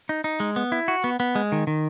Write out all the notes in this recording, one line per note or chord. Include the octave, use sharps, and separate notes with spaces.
D#4
D#4
G#3
B3
E4
F#4
B3
B3
G#3
D#3
D#3